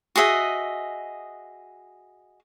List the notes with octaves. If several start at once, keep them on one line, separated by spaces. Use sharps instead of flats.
F#4 G#4 D#5 E5